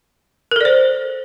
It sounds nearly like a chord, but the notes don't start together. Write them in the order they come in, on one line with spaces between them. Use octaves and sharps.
A#4 A4 D5 C5